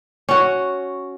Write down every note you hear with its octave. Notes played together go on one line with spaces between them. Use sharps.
C#4 F#4